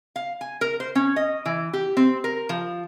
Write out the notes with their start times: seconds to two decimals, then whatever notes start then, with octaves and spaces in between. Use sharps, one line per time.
0.16 F5
0.41 G#5
0.61 A#4
0.80 C5
0.95 C#4
1.16 D#5
1.46 E3
1.73 G4
1.97 C4
2.24 A#4
2.49 F3